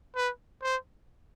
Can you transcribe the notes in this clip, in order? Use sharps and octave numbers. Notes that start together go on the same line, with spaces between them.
B4
C5